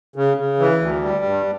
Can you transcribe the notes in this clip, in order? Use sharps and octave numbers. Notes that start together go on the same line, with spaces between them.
C#3
C#3
E3
D2
G3
G2